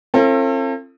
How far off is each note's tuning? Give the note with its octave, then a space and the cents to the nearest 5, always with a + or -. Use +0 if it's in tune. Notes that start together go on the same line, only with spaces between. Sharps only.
C4 +40 F4 -40 A4 +35